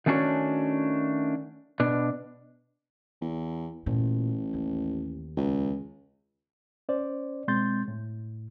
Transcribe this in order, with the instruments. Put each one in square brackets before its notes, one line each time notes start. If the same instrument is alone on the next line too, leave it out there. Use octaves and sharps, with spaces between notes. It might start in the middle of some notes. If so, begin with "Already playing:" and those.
[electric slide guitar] D#3 A3 C#4 D4 F#4 C#5
B2 D4
[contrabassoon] E2
[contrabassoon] A1 [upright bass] A#2
[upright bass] D#2
[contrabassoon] C#2
[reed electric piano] C#4 C5 D5
B2 G#3 C4 C6 G6 A6
A2